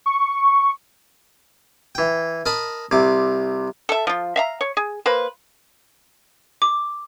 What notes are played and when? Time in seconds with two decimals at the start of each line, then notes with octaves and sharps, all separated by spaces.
0.06 C#6
1.95 E3 G5
2.46 A#4 D#5 A5 B5
2.91 C2 C3 D6
3.89 A4 E5
4.07 F3 F4
4.36 E5 F5 A#5
4.61 C#5
4.77 G#4
5.06 A#3 B4 C5
6.62 D6